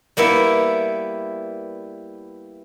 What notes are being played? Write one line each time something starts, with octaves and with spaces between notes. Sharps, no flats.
G3 A#3 B3 E4